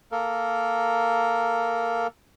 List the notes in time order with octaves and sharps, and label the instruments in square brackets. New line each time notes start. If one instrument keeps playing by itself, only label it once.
[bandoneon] A#3 A4 A#4